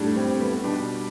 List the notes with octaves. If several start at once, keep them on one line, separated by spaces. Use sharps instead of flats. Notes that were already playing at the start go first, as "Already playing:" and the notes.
Already playing: A2 G3 D4
C4
B3
B2 G3 D4 G4